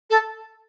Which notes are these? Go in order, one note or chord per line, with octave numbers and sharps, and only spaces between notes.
A4